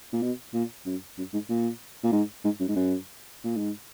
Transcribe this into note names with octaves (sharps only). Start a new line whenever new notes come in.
A#2
B2
A#2
F#2
F#2
G#2
A#2
A#2
G#2
G#2
F#2
G#2
F#2
A#2
G#2